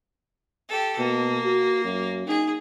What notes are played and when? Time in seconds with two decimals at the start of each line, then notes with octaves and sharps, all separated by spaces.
0.69 G4 A4
0.98 B2 A#3
1.44 F#4
1.84 F#2
2.27 D#4 G#4